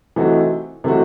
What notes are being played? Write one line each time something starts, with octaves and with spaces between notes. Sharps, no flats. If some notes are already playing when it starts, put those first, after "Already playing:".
C3 E3 A3 D#4 F#4
C3 E3 A3 D#4 F#4